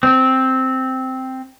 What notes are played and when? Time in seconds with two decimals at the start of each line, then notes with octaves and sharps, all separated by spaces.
0.03 C4